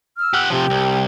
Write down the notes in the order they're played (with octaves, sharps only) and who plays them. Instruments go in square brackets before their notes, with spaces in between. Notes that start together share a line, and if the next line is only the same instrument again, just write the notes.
[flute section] E6 F6
[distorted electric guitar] G4 F#5
[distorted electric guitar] C3 F3 [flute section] G4
[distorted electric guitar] C2